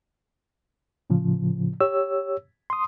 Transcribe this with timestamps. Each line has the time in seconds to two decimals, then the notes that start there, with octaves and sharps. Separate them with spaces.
1.10 A2 C#3 F3
1.80 G4 C#5 E6
2.70 C6 D#6